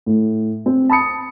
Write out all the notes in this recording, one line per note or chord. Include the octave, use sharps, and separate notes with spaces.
A2
C4
A5 B5 D#6 C#7